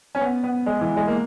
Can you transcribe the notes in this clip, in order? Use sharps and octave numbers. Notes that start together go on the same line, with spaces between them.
C#4
B3
B3
G#3
E3
G#3
A#3